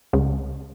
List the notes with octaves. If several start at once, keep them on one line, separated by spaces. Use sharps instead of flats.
C#2